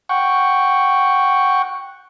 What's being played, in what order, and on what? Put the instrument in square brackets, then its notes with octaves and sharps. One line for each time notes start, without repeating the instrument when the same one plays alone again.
[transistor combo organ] F#5 G5 C#6